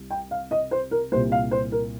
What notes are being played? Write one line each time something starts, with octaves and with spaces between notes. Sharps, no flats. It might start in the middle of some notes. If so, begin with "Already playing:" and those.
Already playing: C2 C3 G3
G5
F5
D#5
C5
A#4
C2 A#2 G3 C5
F5
C5
A#4